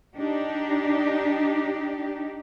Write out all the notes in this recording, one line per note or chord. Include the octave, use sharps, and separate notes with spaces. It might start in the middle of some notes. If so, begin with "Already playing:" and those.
D4 D#4 G4